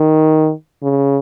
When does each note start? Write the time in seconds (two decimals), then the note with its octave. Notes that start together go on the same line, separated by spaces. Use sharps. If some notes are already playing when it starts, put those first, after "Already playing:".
Already playing: D#3
0.82 C#3